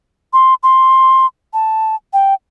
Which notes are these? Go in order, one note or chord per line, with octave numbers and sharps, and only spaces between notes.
C6
C6
A5
G5